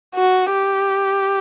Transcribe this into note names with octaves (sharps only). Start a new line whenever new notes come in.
F#4
G4